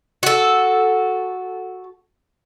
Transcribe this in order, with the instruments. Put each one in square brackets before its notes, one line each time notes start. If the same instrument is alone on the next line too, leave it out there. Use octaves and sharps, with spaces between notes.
[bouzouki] F#4 A4